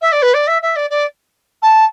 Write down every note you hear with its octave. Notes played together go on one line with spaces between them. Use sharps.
E5
D5
B4
D5
E5
E5
D5
D5
A5